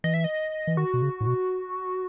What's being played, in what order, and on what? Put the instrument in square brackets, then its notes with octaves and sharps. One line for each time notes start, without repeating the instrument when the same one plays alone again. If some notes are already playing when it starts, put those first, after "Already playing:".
[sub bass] E3 [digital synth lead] D#5
[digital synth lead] E5
D#5
[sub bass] E3
[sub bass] D#3 [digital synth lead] F#4
[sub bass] B2
C#3
A2
B2